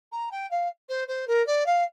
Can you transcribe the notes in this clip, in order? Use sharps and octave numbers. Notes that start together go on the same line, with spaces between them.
A#5
G5
F5
C5
C5
A#4
D5
F5